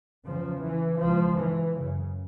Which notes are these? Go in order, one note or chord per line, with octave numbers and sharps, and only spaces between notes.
E2 C#3 F3
E3
C#2 B2 F3
E3
F#2 C#3